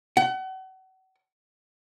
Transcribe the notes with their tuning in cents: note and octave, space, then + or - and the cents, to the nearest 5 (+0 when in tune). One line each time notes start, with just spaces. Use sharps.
F#5 +35